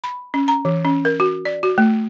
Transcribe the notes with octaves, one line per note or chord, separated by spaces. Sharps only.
B5
C#4
A#5
E3
C#4
A#4
F#4
D5
F#4
A3